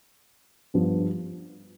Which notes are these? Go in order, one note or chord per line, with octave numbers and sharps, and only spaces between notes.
G2 F3 B3